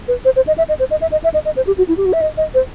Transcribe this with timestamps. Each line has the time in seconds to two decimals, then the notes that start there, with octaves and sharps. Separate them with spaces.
0.08 B4
0.25 C5
0.36 C5
0.47 D#5
0.58 E5
0.69 D#5
0.79 C5
0.91 D#5
1.02 E5
1.12 D#5
1.24 E5
1.34 D#5
1.45 D#5
1.56 C5
1.67 G4
1.78 F#4
1.89 E4
1.98 G4
2.06 F#4
2.13 E5
2.21 D#5
2.37 D#5
2.54 C5